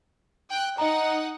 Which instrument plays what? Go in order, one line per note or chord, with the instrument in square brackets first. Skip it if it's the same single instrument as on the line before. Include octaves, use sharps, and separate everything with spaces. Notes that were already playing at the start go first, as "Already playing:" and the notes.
[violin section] G5 F#6
[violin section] D#4 F#5 [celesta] D#5 A#5